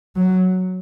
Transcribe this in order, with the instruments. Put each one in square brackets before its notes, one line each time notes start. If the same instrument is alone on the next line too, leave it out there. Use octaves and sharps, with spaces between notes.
[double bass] F#3